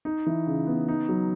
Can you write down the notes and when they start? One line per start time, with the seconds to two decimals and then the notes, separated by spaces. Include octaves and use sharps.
0.05 D#4
0.27 E3
0.47 C#3
0.67 B3
0.88 D#4
1.09 F#3